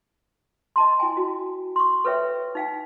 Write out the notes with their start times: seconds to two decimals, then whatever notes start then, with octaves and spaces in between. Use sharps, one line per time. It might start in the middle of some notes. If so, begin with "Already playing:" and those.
0.76 D#5 A5 C6
1.00 E4 G5 G#5
1.17 F#4
1.76 C6 C#6
2.05 A4 B4 C#5 E5 G5
2.55 D#4 F5 G5